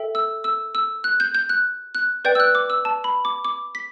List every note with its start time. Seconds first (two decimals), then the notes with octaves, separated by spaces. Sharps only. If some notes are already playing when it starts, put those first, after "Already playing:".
Already playing: A4 E5 G5
0.15 E6
0.44 E6
0.75 E6
1.04 F#6
1.20 G6
1.34 G6
1.49 F#6
1.95 F#6
2.25 B4 D5 G5 G6
2.35 E6
2.40 F#6
2.55 D6
2.70 E6
2.85 A5
3.04 B5
3.25 D6
3.45 D6
3.75 B6